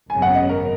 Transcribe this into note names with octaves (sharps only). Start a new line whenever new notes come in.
G#1 F#2 C#3 F#3 B3 G#5
F#5
D#5
A#4